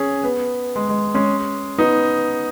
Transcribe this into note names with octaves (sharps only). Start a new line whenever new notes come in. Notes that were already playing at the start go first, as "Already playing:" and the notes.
Already playing: C#4 G#4
B3
G#3
G#3
G#3 C#4
B3 D#4